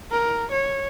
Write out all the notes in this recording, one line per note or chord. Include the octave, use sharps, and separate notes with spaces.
A#4
C#5